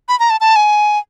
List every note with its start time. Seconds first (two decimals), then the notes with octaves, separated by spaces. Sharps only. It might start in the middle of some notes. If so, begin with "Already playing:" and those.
0.09 B5
0.20 A#5
0.30 A5
0.41 A5
0.56 G#5